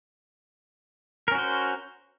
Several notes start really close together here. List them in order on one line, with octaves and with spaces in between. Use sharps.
A#4 C#4 F#4 C5